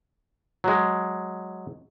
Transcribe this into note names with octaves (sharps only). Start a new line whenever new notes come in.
F#3 G#3